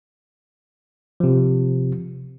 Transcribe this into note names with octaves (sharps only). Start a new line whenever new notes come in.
C3 F3